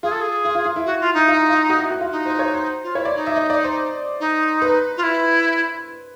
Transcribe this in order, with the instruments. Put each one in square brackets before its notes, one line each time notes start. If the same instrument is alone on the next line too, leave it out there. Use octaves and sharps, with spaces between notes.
[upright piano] F4 [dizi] G#4
[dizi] A4
G#4
[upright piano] F4
F4
F4
E4
[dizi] F#4
F4
[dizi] D#4 [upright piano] E4
[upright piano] F4
F4
F#4
E4
F#4
F4
[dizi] D#4
[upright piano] C5
C#5
C5
[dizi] F4
[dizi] E4 [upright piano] C#5
[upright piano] D5
[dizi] D#4
[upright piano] E5
D#5
D5
C5
[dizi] D#4
[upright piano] B4
[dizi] F4
E4